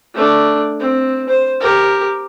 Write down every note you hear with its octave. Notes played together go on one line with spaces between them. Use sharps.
A3 D4
C4
C5
G4 A#4